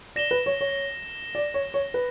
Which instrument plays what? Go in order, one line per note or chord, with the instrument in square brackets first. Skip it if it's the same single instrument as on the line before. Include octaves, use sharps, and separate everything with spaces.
[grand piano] D5 [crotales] A#6 E7 G7
[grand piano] B4
C#5
C#5
D5
C#5
C#5
B4